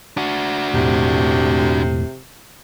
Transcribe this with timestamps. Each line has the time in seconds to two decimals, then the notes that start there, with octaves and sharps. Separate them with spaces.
0.17 D4 F#4
0.74 E1 A2 C3